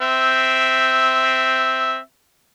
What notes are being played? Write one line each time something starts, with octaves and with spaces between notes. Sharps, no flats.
C4 E5